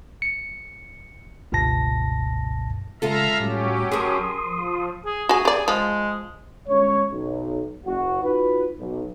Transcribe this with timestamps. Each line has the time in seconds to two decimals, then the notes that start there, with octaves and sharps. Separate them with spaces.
0.22 C#7
1.52 G1 C#2 G2 B2 A5 A#6
3.02 C#3 G#3 F4 A4 E5 F5 A#5
3.40 A2 F#3 G3 C#4 G4
3.92 G#4 A#4 A5 C6 D#6
4.44 F3
5.05 G#4
5.29 F#4 G#4 G#5
5.45 G4 D5
5.68 F3 G#3
6.68 G1 G#3 C#4 C#5
7.11 B1
7.86 F#1 F#4
8.23 D#4 F4 F#4 B4
8.80 B1